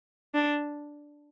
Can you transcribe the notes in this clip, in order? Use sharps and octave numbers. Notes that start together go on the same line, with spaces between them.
D4